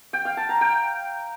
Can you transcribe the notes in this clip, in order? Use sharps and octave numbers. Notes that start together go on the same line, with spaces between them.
G5
F5
A5
A#5
G5